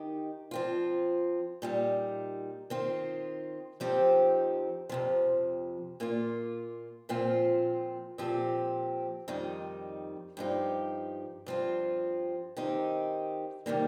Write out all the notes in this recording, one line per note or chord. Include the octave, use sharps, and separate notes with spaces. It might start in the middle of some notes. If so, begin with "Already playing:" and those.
Already playing: D#3 D#4 G4
F3 C4 F4
A#2 G3 D#4
D#3 C4 F4
F2 F3 C4 D#4 G4
F2 C3 F3
A#2 A#3 F4
A#2 F3 C4 F4
A#2 F3 C4 G4
F2 D#3 G3 D#4
G2 F3 D#4 G4
G2 F3 C4 F4
D#3 C4 D#4 G4
C3 D#3 G3 A#3 D#4